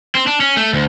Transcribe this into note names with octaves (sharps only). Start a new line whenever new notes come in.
C4
D4
C#4
A3
D2